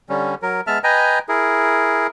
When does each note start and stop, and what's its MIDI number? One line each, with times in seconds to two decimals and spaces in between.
0.09 0.35 50
0.09 0.35 55
0.09 0.35 61
0.42 0.61 54
0.42 0.61 70
0.67 0.79 56
0.67 0.79 59
0.67 0.79 76
0.67 0.79 81
0.67 0.79 89
0.84 1.19 71
0.84 1.19 75
0.84 1.19 79
0.84 1.19 80
0.84 1.19 82
1.29 2.07 64
1.29 2.07 68
1.29 2.07 70